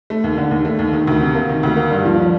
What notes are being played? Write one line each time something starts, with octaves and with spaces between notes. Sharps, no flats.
A3
D#2
D3
D#2
A3
D#2
D#3
D2
C3
A#3
D#3
D2
A#3
G2
F3
D4